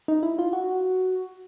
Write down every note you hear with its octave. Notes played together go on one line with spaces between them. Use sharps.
D#4
E4
F4
F#4